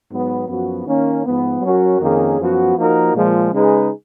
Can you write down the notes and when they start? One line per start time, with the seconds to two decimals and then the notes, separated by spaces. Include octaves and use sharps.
0.10 G#2 F#3 B3
0.48 F#2 F3 B3 F#4
0.87 D#3 A#3 C#4
1.24 G#2 F3 B3
1.62 F#3 C#4 F#4 A#4
2.00 F2 D#3 A#3 C#4 G#4
2.38 F#2 F3 B3 F#4
2.77 F3 A#3 D#4 F#4 A#4
3.14 A#2 F3 G#3
3.52 C#3 G#3 D#4 G#4 B4